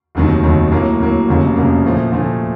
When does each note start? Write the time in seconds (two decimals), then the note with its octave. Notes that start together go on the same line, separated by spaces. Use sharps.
0.15 F1 D#2 D#3 F#3
0.43 F1 D#2 D#3 F#3
0.71 A2 F#3 A#3
1.00 A2 F#3 A#3
1.28 F1 F2 C#3 F#3 A#3
1.56 F1 F2 C#3 F#3 A#3
1.85 A#2 F3 A3
2.12 A#2 F3 A3